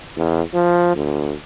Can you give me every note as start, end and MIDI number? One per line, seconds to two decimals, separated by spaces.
0.17 0.42 40
0.54 0.91 53
0.96 1.34 38